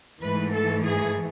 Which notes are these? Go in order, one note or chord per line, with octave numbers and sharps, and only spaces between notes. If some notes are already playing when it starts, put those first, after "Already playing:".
G#2 E3 A3 B4
A4
G#4